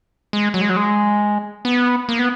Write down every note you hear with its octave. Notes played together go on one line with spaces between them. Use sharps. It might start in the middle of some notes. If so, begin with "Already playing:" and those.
G#3
F#3
G#3
F#3
G#3
B3
A#3
B3